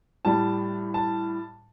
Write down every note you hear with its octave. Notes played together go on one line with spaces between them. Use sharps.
A2 G3 A5
A5